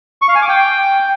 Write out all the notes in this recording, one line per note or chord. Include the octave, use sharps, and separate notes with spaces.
C#6
F5
G#5
D6
G5